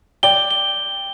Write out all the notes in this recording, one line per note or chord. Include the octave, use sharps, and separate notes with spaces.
D5 G5 G7
G7